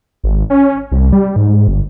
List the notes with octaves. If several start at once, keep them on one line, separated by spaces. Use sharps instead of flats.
G#1
C#4
C2
G3
G#2
G1